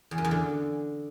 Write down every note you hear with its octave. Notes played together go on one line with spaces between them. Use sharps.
E2
F#2
E2
D3